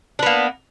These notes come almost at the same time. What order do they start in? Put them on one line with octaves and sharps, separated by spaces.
D4 B3 A#3